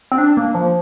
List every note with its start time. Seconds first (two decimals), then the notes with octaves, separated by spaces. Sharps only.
0.12 C4
0.18 D4
0.37 A#3
0.55 F3